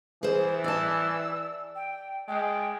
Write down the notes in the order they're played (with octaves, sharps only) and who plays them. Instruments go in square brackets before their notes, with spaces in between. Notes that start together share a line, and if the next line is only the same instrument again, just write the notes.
[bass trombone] E3 [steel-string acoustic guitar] G#4 C5
[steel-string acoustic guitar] D5 A5 [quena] E6
[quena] G5
[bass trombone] G#3 [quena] G5